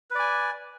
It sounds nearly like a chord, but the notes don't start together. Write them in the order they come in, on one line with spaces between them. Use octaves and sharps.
B4 D5 G#5